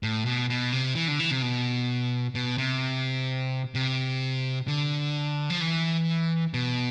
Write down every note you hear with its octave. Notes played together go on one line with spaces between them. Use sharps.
A2
B2
B2
C3
E3
D3
E3
C3
B2
B2
C3
C3
D3
F3
E3
B2